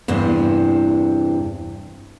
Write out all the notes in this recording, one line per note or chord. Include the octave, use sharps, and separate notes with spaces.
E2 G2 C3